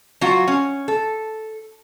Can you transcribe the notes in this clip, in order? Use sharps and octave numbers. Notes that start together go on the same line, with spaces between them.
F#3 F4 F#4
C#4
A4